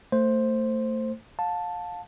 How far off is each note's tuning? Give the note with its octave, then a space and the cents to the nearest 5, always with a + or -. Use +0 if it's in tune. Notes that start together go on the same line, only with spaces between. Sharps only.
A3 +25 C5 +5
F5 +30 A5 +0